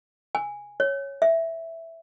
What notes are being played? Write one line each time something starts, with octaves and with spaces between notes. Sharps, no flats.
G#5
C#5
E5